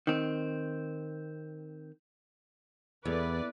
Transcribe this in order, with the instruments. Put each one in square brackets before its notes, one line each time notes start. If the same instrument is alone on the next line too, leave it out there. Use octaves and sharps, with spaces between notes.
[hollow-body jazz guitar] D#3 C4
[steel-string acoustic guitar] E2 [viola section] A4 B4 D5